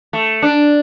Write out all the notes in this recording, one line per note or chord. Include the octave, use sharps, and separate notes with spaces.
A3
D4